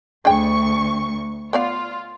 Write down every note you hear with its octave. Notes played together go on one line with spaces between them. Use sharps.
D2 D4 G#4 G5 C#6
B3 F4 D5 F5